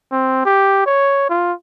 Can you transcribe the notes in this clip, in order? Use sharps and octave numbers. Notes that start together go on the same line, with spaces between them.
C4
G4
C#5
F4